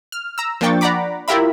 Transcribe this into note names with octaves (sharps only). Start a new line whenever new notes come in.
F6
A#5 E6
F3 A#3 D4 G5 C#6 A6
D5 F#5 A#5 B5 D6
E4 F4 G4 A#4 E5 B5